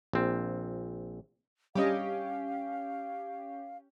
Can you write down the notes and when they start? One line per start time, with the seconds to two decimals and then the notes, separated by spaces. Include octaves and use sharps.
0.13 A#1 C4
1.75 G3 C#4 G4 D#5 F5